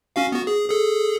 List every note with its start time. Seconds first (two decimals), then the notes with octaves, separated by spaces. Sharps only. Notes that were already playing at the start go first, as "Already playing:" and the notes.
0.16 C#4 F#4 F5
0.32 B3 F#4
0.47 G#4
0.69 G#4 A4